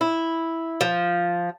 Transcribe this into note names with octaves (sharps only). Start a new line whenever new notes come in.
E4
F3